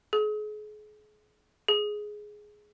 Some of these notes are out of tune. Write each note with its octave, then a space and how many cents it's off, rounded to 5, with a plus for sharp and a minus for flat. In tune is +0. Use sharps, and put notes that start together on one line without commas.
G#4 +35
G#4 +10